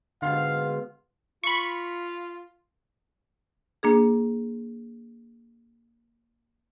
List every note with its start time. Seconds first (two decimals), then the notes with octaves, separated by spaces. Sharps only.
0.22 G#2 B2 D3 F4 F5
1.44 F4 B5 C#6
3.83 A#3 D4 G#4